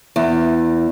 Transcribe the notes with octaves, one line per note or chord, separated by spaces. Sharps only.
E2